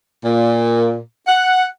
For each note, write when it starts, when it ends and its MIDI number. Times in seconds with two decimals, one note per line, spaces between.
0.24 0.99 46
1.27 1.66 78